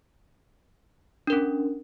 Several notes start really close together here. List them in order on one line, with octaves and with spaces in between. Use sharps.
D4 A#4 C#4